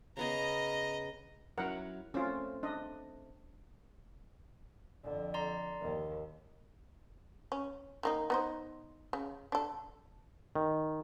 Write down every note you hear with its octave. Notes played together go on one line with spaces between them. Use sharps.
C#3 B3 G#4 D#5 A#5
F#3 C#4 E4 A#4 F#5
A3 C4 C#4 F4
D4 D#5
F2 D3
D5 A#5 C6
D#2 D#3
C#4
D#3 A#3 D#4
B3 D#4 C5
C#3
D4 A4
D#3